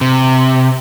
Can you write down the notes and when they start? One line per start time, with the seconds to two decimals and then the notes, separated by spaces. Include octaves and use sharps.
0.01 C3